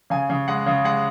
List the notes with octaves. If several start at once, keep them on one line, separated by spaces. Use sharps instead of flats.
C#3 G#5
C#3
G#3 F#5
C#3
G#3 F#5